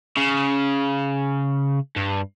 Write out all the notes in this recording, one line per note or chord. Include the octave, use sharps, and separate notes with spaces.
C#3
G2